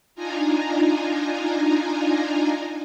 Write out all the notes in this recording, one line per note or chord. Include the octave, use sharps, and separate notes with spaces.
D4 D#4 F4 G#5 A#5